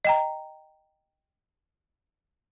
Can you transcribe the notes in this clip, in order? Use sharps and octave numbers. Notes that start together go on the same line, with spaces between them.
D#5 G5 A#5